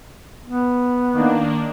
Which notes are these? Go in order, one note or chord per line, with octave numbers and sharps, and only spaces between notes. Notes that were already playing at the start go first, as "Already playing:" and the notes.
B3
D#3 A#3 D4